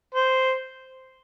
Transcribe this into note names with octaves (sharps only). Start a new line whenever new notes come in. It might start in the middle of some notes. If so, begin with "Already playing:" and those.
C5